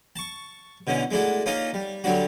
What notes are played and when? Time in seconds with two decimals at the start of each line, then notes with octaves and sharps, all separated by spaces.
0.16 A5 C#6
0.87 B2 D3 E3 C#4
1.11 G#3 A3 D4 E4 F#4
1.46 A#3 C#4 D#4 F4 A#4
1.74 G3
2.04 D3 F#3 G3 D4 F#4